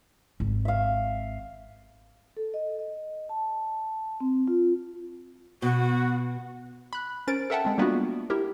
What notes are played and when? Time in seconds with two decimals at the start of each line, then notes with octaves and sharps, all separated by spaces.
0.40 G#1
0.65 E5 F5
2.37 A4
2.54 D#5
2.79 D#5
3.29 A5
4.20 C4
4.48 F4
5.62 B2 F#4
6.93 B5 F#6
7.27 C#4 A#4 C5 A6 D7
7.50 A4 A#4 E5 F#5 G5 A5
7.65 G#3 C4
7.78 G3 A#3 B3 D4 F4 F#4
8.30 E4 G4 A#4